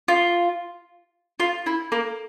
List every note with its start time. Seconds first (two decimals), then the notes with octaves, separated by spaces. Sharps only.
0.08 F4
1.40 F4
1.66 E4
1.92 A#3